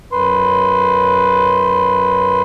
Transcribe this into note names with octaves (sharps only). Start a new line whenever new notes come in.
F#2 B4 C6